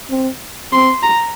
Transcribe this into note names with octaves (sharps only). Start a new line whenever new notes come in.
C4
C4 C6
A#5